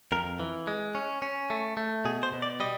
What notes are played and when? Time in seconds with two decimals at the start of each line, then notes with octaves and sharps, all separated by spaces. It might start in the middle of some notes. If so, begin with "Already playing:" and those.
0.12 F2 A#4
0.40 E3
0.67 G#3
0.95 C#4
1.22 C#4
1.50 A3
1.77 A3
2.05 B2 G#4
2.23 C5
2.33 B2
2.42 D5
2.60 G3 D#5